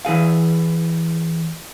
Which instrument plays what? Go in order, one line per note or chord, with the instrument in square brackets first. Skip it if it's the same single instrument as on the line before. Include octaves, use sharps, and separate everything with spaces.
[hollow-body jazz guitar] E3 E4 G#4 F5